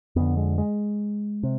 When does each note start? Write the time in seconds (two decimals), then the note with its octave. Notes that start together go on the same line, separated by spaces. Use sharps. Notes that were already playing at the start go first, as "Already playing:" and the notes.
0.16 F2 D3 B3
0.37 G#3
0.58 G#3
1.43 C3